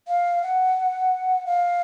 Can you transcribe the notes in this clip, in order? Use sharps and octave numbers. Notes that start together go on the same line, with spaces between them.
F5
F#5
F5